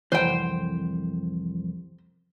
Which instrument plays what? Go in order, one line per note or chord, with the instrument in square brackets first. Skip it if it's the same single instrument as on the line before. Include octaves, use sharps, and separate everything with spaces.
[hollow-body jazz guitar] C2 F2 E3 [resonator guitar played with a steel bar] C5 G5